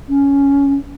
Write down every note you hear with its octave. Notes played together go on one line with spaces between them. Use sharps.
C#4